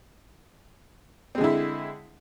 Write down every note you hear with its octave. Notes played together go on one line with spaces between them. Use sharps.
D3 G#3 C4 E4